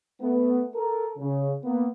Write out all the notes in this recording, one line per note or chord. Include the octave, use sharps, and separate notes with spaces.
A3 B3
A4 A#4
C#3
A#3 B3